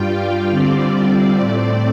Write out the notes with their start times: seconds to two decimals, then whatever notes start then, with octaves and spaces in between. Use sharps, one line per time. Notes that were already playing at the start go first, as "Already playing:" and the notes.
Already playing: G2 G3 F4 G5
0.08 F5
0.51 D3 G3 C4 F4 D5
1.35 A2 A3 C4